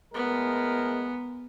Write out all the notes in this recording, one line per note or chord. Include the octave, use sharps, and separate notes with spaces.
A2 G#3 B3 A#4